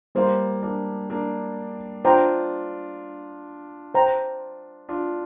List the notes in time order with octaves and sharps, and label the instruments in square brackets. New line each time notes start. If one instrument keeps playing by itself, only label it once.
[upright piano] G3 A#3 [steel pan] C5 F5 C6
[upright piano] A#3 D4
A#3 D4
[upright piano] D4 F4 [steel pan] C5 G5 A#5
[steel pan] C5 G5 A#5
[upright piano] D4 F4